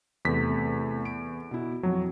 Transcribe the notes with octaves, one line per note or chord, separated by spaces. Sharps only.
E2 C3 A3 B6
D7
B2 E4
F2 F#3